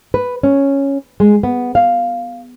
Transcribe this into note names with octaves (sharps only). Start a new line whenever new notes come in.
B4
C#4
G#3
B3
F5